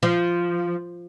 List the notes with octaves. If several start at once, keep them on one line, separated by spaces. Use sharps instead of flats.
F3